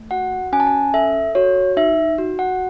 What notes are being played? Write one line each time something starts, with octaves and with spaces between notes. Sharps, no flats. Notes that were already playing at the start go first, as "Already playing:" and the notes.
Already playing: A3
F#4 F#5
C#4 G#5
A5
G#5
A4 E5
F#4 C#5
D#4 E5
F#4
F#5